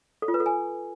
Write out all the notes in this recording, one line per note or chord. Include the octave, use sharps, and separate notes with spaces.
A4
F4
B4
A4
G#5